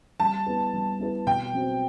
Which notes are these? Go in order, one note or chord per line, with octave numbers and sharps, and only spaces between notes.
G3 A5
B3 E4 B4
G3
B3 E4 B4
B2 G5
F#3 C4 F#4 C5